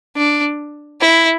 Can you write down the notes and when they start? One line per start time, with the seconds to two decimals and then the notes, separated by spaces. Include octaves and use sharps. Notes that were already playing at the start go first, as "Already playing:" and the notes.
0.17 D4
1.02 E4